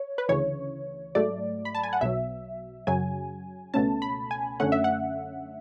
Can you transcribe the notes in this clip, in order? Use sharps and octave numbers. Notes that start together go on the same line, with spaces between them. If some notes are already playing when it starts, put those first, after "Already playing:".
Already playing: C#5
B4
D2 C#3 E3 C#5
G#2 F#3 A3 D5
B5
A5
G#5
F#5
B1 B2 F#3 E5
F#2 C#3 F#3 G#5
C#2 B2 A3 C#4 A5
B5
G#5
F#2 D3 A3 C#4 F#5
E5
F#5